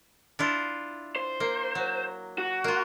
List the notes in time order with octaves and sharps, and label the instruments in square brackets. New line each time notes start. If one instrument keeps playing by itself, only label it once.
[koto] D4 E4 F4
[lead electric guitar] C5
[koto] A#3
F#3
[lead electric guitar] F#4
[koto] A#3 F4